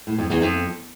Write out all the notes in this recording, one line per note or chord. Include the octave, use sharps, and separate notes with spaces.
A2
F2
E2
F2